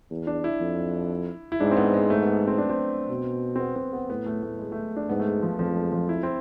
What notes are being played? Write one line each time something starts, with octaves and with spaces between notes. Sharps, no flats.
E2
D4
E4
F2
E4
G#2 D4
C4
B3
G#3
A3
B3
C4
D4
C4
B2
C4
B3
C4
B3
A2 B3
A3
A3
G#3
A3
D4
G#2 B3
A3
G#3
F3
F2 F3
G#3
F3
E4
C4